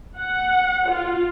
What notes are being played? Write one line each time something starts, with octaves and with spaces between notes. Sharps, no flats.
F#5
F4